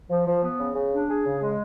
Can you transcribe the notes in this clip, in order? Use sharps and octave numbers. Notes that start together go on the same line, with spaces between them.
F3
F3
B3
C#3
C#3
D4
G#4
C#3
G#3